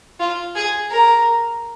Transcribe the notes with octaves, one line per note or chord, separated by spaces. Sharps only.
F4
G#4
A#4